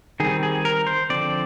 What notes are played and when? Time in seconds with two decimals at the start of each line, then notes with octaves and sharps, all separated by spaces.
0.20 D#3 G3 C4 G#4
0.43 G#4
0.65 A#4
0.87 C5
1.10 D3 F3 C4 D5